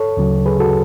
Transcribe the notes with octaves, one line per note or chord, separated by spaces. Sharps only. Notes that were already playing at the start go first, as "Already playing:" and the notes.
Already playing: A4 C#5
D2 C#3 F#3
G#4 B4
F#4 A4